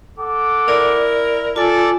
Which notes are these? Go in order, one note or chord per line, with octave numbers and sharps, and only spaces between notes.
A4 F#5 D6
E4 A#4 D5
F4 A4 D5 G#5